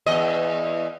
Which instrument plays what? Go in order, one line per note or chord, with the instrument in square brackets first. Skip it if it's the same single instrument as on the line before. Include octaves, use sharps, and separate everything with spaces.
[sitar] E2 D#5